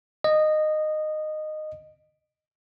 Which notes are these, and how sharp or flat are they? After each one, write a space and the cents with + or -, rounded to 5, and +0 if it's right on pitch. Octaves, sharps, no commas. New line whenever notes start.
D#5 -15